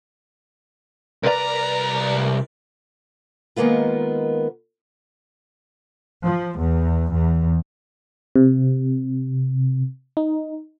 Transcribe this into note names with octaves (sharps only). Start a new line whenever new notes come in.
C2 A#4 B4 D5 A#5
D#3 G#3 A#3 B3 F4
F3
E2
E2
C3
D#4